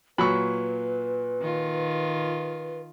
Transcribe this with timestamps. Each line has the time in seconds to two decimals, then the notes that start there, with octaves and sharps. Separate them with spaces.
0.18 A#2 F#3 B4 B5 C#6
1.41 D#3 F4